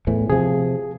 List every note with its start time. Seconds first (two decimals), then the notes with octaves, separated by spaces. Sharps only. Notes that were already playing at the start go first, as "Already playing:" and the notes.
0.07 E2 A2 E3
0.30 C3 F3 G#4